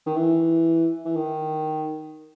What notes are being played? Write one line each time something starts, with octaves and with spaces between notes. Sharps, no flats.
D#3
E3
E3
D#3